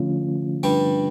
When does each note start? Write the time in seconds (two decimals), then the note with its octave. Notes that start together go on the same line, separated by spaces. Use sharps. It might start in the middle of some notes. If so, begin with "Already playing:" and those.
Already playing: D3 F3 A3 C#4 F4
0.63 G2 G3